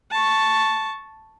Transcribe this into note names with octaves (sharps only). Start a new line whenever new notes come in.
A5 C#6